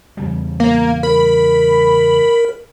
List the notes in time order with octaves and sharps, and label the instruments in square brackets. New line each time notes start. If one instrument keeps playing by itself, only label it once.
[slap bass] E2 C#3 G3
[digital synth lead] A#3
[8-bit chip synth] A#4 [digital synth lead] B5